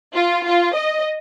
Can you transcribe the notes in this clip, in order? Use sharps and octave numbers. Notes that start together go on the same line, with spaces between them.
F4
F4
D#5